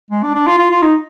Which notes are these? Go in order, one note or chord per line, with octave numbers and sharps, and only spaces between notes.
G#3
D4
D4
F4
F4
F4
D#4